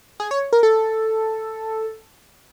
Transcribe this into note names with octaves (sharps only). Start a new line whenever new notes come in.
G#4
C#5
A#4
A4